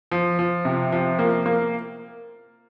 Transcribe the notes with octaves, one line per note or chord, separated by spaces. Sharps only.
F3
F3
C3
F3
A#3
A#3